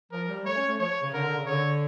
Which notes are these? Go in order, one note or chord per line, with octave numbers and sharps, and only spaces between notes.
F3 A#4
G3
A3 C#5
C#4
A3
F3 C#5
C#3
D3 A#4
D3
C#3
D3 C#5